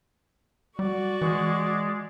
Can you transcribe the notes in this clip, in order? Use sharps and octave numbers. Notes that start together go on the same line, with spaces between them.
G3 F#4 D5 C#6
E3 G#3